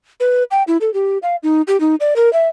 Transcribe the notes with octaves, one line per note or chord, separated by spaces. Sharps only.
B4
G5
E4
A4
G4
F5
D#4
G4
D#4
D5
A#4
E5